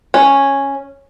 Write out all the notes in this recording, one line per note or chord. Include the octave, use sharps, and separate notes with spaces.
C#4